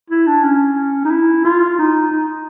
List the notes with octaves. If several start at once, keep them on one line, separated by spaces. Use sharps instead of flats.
E4
D4
C#4
D#4
E4
F4
D#4
D#4